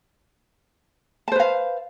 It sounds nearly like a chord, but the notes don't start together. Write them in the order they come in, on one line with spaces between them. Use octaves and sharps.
A5 C5 B4 F5